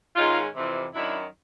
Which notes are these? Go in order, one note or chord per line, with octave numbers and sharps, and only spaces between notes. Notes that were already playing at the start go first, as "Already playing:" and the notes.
G#2 D#3 G#3 C#4 D#4 F4
F2 C3 E3
F#2 D#3 F#3 D4 E4